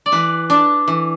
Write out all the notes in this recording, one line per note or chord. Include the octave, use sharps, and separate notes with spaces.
D5
E3 B4
D4
E3